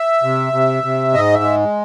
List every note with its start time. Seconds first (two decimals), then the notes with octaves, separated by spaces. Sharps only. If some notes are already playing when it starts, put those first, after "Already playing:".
Already playing: E5
0.23 C3
0.53 C3
0.84 C3
1.14 G#2 D#5
1.34 E5
1.43 G#3